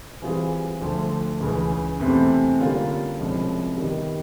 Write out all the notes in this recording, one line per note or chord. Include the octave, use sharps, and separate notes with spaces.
E3 G3 C4 F4 G#4
D2 D3 F3 A3
C#2 C#3 E3
E2 C3 E3 A3 C4
D3 G3 A#3 C#4 F4
C2 C3 F3 G#3 C#4
D#3 G3 B3